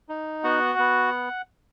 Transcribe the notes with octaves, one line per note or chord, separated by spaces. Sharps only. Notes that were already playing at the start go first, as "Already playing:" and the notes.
D#4
B3 F#4 F#5
B3